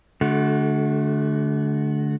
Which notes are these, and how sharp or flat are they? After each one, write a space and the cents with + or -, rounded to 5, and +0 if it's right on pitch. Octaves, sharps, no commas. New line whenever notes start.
D3 -10 A3 -35 F#4 +0